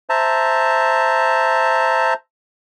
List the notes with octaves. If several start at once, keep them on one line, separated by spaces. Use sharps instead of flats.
C5 E5 A5 A#5